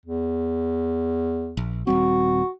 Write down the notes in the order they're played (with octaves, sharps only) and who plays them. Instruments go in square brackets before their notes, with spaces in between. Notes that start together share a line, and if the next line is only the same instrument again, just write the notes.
[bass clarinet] E2
[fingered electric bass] A#1
[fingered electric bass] D#1 G3 C4 [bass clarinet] F#4